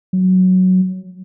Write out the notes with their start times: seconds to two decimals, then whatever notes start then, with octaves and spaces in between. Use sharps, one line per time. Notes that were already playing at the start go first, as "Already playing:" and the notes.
0.13 F#3